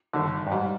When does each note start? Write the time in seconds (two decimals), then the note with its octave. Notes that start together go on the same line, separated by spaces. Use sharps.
0.13 G1 G2 D3 D#3
0.47 G2
0.52 G#2 G3